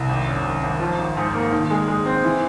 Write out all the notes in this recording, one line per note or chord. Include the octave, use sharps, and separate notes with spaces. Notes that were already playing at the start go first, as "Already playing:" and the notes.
Already playing: C2
G#1
F#2
G#1
G#1
F3
G#1
G#2
A#3
D#3
G#3
G#3
C4
E3